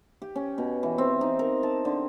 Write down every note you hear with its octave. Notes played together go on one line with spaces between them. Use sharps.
G4
C#4
B2
E3
C4
D#4
A#4
A5
D3